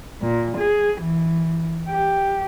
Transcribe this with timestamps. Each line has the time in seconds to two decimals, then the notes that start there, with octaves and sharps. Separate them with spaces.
0.21 A#2
0.58 G#4
1.01 E3
1.89 G4